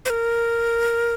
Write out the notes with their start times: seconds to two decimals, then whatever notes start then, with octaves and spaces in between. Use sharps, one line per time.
0.05 C5
0.10 A#4